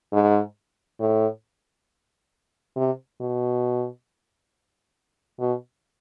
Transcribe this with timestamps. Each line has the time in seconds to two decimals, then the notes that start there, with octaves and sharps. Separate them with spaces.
0.13 G#2
1.00 A2
2.76 C3
3.21 B2
5.40 B2